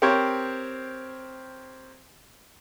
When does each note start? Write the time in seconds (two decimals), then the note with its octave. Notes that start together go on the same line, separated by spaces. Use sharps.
0.02 C4 G4 A#4 C5 C#5